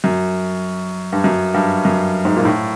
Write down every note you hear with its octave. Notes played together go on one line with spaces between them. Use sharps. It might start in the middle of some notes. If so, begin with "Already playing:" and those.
F#2
G2
F#2
G2
F#2
G#2
A#2
A2